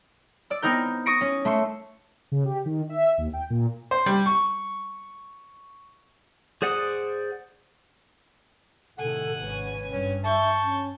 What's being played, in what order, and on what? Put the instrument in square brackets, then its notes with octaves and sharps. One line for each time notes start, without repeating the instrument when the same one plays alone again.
[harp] D5 E6
B3 C4 D#4 A#4 G6
C#6 D#6 A#6 C#7 D7
C#4
A3 E5 C6 C#6
[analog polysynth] C#3
G4
D#3
E5
D#2
G5
A#2
[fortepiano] C5
G3
C#6
[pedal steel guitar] G#4 C5 D5 F#5 D#6
[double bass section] A2 C3 D#3 [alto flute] A4 [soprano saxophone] F#5 [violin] G#5
[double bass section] G#1 C#4 [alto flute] B4
[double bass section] G2 [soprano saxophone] C#4
[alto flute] E5 [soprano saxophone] A5 [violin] C#6 G6
[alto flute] C#4